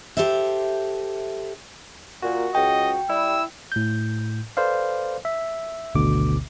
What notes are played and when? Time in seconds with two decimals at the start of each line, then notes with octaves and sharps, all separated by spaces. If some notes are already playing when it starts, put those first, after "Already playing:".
0.17 G4 A4 C5 E5
2.22 A#2 F#4
2.55 C#2 D#5 G5
3.09 G3 E4 E6
3.72 A2 G6
4.57 A4 B4 C5 D5 F5
5.25 E5
5.95 G#1 D2 B2 D3 B3 D6